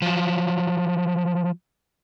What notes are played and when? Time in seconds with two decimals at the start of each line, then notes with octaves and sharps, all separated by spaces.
0.02 F3 F#3